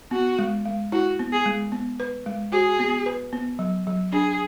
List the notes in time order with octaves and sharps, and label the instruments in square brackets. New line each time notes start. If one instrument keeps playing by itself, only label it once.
[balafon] B3 [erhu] F#4
[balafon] G#3
G#3
[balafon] E4 [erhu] F#4
[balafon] B3
[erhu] G#4
[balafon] G#3
B3
B4
G#3
[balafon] F#4 [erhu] G#4
[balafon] B3
B4
B3
F#3
F#3
[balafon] D4 [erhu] G#4